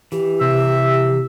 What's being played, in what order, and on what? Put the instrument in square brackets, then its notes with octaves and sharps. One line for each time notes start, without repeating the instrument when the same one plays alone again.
[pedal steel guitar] E3 [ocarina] G4
[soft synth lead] C3 [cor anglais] E5